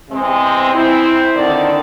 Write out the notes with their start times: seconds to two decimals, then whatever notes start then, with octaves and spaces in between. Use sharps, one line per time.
0.10 E2 C3 G#3 C4
0.73 C4 E4
1.35 D3 D#3 D5